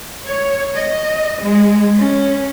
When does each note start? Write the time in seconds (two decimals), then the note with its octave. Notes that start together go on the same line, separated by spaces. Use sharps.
0.25 C#5
0.75 D#5
1.41 G#3
1.98 C#4